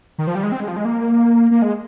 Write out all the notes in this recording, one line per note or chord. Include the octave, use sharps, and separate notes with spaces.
D#3
F3
G3
G#3
C4
G#3
F3
G#3
A#3
A#3
G#3